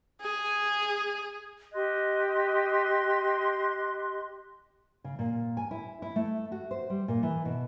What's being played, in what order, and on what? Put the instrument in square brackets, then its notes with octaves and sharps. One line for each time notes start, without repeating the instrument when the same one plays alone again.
[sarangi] G#4
[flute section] G4 D#5 C6 F#6
[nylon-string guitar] C#3
A#2
G#5
E4
E4
A3
F#4
C5
G3
A#2
E3
B2